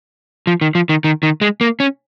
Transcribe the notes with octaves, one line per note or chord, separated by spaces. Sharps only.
F3
D#3
F3
D#3
D#3
D#3
G#3
A#3
C#4